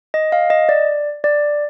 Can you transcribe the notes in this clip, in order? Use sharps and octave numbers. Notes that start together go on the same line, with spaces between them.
D#5
F5
D#5
D5
D5